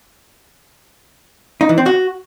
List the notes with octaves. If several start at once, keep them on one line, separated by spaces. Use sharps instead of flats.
D#4
E3
C4
F#4